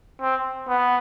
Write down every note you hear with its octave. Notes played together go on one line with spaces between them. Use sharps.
C4
B3